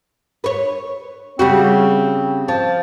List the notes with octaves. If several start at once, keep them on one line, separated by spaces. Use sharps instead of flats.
B4 C#5
C#3 G3 C4 F#4
F3 A5